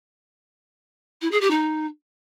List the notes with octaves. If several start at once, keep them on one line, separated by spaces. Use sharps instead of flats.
E4
G#4
G4
D#4